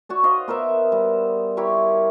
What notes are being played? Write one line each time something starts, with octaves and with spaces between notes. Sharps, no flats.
F#4 C#5 D5
C5 D#5 F5
B3 A#4 C5 E5
G3
E4 G4 A#4 C#5